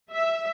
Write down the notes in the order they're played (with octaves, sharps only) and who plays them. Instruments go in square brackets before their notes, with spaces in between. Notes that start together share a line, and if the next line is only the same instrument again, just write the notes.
[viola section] E5